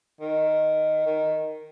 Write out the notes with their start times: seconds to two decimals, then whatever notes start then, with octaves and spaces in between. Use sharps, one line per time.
0.21 D#3
1.07 D#3